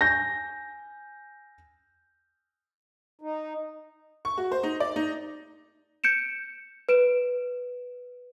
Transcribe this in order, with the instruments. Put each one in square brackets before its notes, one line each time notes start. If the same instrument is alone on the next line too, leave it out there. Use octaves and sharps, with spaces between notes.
[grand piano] G#5 G6 A#6
[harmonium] D#4
[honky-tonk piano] C#6
F#4
C5
D#4
D5
D#4
[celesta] G6 C#7 D7 E7
B4 D7 E7